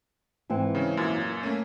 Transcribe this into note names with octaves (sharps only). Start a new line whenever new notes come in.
G#2 E3 C4
C#3 C#4
F#2 A#2
A3 A#3 C#4